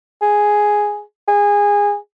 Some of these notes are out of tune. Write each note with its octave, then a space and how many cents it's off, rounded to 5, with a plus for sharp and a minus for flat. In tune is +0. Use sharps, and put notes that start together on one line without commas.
G#4 +0
G#4 -20